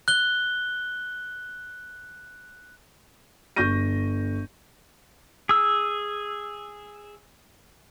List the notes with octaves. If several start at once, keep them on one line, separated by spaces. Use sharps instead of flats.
F#6 G7
G1 C#6 G6 A#6 D#7
G#4 E6